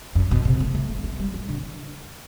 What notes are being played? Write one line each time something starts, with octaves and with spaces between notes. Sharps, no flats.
F#2
B2
C3
A3
A3
G3
A3
G3
F#3
D3